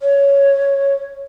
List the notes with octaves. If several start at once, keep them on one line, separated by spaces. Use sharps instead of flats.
C#5